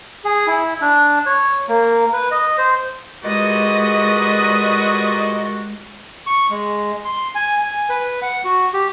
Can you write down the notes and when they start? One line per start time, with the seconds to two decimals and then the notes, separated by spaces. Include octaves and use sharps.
0.24 G#4
0.47 E4
0.81 D4
1.26 C#5
1.69 A#3
2.13 B4
2.31 D#5
2.58 C5
3.24 A#2 G3 G#3 F#4 B4 D#5 D#6
6.27 C#6
6.50 G#3
7.05 C6
7.35 G#5
7.59 G#5
7.89 B4
8.22 F#5
8.45 F#4
8.73 G4